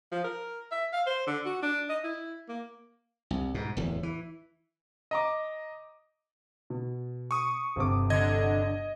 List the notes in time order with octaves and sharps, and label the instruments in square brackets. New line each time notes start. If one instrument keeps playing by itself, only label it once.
[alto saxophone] F3
A#4
E5
F5
C5
D3
F#4
D4
D#5
E4
A#3
[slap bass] C2
G#2 B2
D1 E2
E3
[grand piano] D#5 A#5 D6
B2
[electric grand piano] C#6 D#6
[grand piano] G1 C3 D6
[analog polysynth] D3 [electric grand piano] D#5 G#6